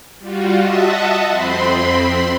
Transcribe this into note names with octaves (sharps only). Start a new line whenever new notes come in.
G3 F4 F#4
D#5 E5 F#5 A5
F2 C4 B5 C6